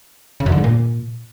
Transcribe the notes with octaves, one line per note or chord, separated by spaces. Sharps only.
C#3
F#2
D3
G#2
A#2